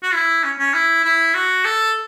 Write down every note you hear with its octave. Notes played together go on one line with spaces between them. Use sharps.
F#4
E4
C#4
C#4
E4
E4
F#4
A4